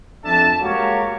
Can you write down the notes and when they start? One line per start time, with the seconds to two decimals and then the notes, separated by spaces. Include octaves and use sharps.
0.25 F2 D4 A4 E5 A5
0.61 G#3 A#3 F#4 G4 A#4 C#5